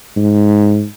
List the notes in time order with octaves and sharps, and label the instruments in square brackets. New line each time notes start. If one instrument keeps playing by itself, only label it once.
[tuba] G#2